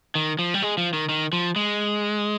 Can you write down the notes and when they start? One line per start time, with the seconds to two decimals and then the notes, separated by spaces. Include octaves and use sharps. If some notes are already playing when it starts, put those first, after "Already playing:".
0.15 D#3
0.39 F3
0.54 G3
0.62 G#3
0.78 F3
0.93 D#3
1.09 D#3
1.33 F3
1.56 G#3